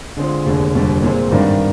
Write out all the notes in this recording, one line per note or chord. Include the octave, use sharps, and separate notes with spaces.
D3 G#3 C4 F4 G#4
F1 D#2 D3 G#3
F1 D#2 D3 G3 D4
A#2 G#3 C4
G#1 G2 D#3 G3 D4